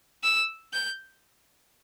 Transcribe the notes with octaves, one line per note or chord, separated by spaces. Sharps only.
E6
G6